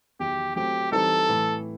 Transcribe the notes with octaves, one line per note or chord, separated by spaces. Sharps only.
E2 D#3 F#3 G4
F#3 A3 C4 G4
E3 G3 C4 D#4 G4 A4
A2 E3 A3